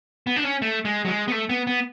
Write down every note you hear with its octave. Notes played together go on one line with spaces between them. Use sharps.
B3
D4
C#4
A3
G#3
F#3
G#3
B3
A3
B3
B3